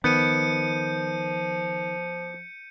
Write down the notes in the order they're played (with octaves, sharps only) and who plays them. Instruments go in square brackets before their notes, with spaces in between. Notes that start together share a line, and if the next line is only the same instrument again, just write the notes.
[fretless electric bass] D#3 [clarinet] F3 [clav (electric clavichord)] B3 [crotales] G6 C#7 D#7